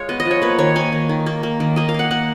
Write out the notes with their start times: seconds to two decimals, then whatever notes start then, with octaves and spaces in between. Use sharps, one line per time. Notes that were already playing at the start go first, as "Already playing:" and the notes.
Already playing: G#3 C#5 F5
0.09 B3 D#5
0.20 D#5
0.25 F3
0.31 C#5
0.42 A#3 B4
0.59 D#3 C#5
0.76 A#3 G#5
0.93 D#3
1.09 D#3
1.26 A#3
1.43 A#3
1.60 D#3
1.76 A#3 D#5
1.89 F5
1.94 A#3 F#5
2.11 A#3 F#5